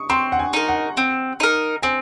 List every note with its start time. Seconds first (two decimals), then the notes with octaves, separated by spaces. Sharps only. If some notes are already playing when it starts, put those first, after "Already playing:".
Already playing: C#6 D#6
0.10 C4 C6
0.32 F#5
0.39 G#5
0.53 D#4 A#4
0.68 F#5
0.97 C4
1.40 D#4 A#4
1.82 C4 G#5